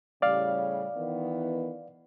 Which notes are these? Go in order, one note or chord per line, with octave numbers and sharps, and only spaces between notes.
A2 C#3 G3 D5 F5
D#3 E3 B3